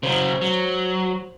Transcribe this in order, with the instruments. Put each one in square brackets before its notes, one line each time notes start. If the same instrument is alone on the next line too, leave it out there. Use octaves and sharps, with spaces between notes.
[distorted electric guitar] C#3 F#3 [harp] C5
[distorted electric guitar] F#3